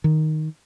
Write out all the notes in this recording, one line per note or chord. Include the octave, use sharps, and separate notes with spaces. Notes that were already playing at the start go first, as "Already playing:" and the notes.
D#3